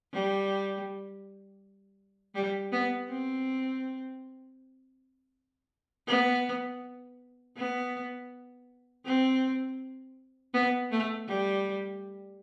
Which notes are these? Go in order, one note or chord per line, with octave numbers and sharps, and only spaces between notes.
G3
G3
B3
C4
B3
B3
C4
B3
A3
G3